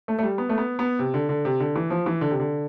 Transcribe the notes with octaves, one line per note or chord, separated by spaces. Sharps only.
A3
A3
G3
B3
A3
B3
B3
C3
D3
D3
C3
D3
E3
F3
E3
D3
C3
D3